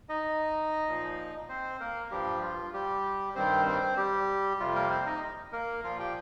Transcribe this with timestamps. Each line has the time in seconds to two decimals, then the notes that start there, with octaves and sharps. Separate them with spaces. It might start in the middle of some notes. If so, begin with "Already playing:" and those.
0.09 D#4 D#5
0.87 A#2 F3
1.49 C4 C5
1.80 A#3 A#4
2.11 G2 F3 G3 G4
2.42 F4
2.73 G3 G4
3.35 G2 D#3 G3 C4 C5
3.66 C4 C5
3.97 G3 G4
4.60 F2 C3 G3 F4
4.75 A#3 A#4
4.90 C4 C5
5.06 D#4 D#5
5.53 A#3 A#4
5.84 A#2 F3 F4 F5
5.99 G4 G5